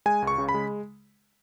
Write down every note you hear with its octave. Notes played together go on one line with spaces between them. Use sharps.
G#3 G#5
C#2
C#6
C#3
B5
G#3